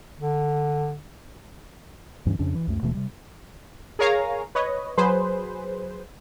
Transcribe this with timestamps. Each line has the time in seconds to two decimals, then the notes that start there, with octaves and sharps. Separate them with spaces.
0.20 D3
2.26 D2 G2 E3 C#4
2.39 F2 C#3 C#4 D4
2.55 E3
2.67 C#2 F#2 A3
2.82 D#1 B2 E3 A3
2.95 C3 G3
3.99 G#4 A#4 C#5 F5 G#5 A#5
4.55 B4 C#5 D#5
4.97 F#3 G#4 B4 C5